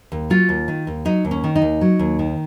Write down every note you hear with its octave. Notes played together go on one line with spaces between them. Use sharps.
D#2
F#3 F4
D#2
D#3
D#2
F#3 D#4
D#2
C#4
D#3
D#4
D#2
F#3
D#2
D#3